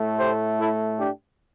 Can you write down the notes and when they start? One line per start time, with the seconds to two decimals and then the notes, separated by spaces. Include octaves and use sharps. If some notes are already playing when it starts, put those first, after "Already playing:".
Already playing: A2 A3
0.18 G4 C5
0.58 E4 A4
0.98 D4 G4